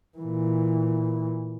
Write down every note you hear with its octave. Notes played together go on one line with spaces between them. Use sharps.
A#2 E3